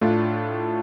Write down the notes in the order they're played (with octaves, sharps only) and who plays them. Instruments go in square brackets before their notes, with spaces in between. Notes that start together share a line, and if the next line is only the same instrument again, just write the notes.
[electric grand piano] A2 A3 D4 F4